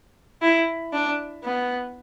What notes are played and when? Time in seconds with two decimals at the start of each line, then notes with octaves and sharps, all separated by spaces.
0.42 E4
0.93 D4
1.44 B3